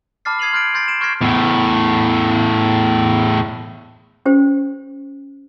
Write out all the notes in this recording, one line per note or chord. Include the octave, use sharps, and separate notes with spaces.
A5 B5 D6 F6 A6 C7
D#6 G#6 C7 D#7 F7 F#7
C6 F6 G6 A6 D7
C6 G6 A6 C7 D7
D7 E7
C#6 F6 G6 G#6 A#6 C7
E2 A2
C#4 G4 C5